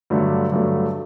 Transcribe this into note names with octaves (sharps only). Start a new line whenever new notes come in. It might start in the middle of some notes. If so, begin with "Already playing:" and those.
G2 D3 F#3 A3
G2 D3 F#3 A3